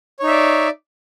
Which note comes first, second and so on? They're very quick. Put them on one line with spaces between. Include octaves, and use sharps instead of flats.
C#5 D#4 E5 D5